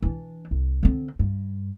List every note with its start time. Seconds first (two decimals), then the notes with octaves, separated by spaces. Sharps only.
0.02 E3 D4
0.51 C2
0.83 D3 C4
1.19 G2